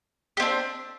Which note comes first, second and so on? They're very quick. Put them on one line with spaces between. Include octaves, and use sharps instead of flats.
G4 C4 D4